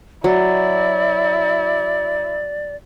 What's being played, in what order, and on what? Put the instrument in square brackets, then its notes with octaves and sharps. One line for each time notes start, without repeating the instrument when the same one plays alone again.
[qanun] F#3 [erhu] E4 [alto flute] D5